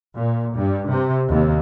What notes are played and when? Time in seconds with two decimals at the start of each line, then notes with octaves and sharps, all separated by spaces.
0.15 A#2
0.55 G2
0.88 C3
1.29 D#2